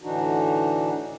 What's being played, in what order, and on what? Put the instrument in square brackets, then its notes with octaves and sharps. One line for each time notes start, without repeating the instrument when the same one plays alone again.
[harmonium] A2 D3 E3 D4 D#4 F#4